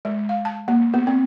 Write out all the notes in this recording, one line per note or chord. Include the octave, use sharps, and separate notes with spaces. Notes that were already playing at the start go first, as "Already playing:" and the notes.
G#3
F5
A5
A#3
B3
C4